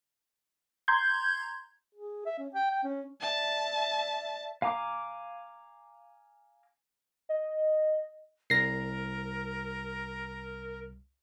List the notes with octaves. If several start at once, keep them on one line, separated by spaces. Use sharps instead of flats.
A#5 C6 G6 G#6
G#4
E5
C#4
G5
G5
C#4
D5 E5 A5
F5 G#5 A#5 D6
D#5
C2 A#4 A#6 C7